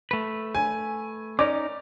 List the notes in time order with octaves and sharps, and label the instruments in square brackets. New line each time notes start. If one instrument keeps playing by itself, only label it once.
[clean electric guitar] A3 B4
[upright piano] G#5
[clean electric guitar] C#4 D#4 A#4 [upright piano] D5 D6